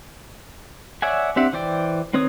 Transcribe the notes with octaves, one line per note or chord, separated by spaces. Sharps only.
C#5 D5 E5 F#5 G#5
C4 D4 G4 E5 F#5
E3 C5 D5 G5
D#3 C4 B4 C#5 D#6